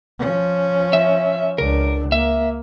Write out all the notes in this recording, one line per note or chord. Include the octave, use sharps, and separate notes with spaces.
F3 C#4
E5
C#2 D4 A#4
A#3 E5